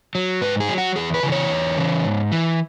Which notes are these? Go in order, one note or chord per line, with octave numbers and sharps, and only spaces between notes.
F#3
G#2 B4
G#4
F#3
F#4
E2 G#4
B4
C#3 E3
C#5
E2
C#3 E3
G#2
E3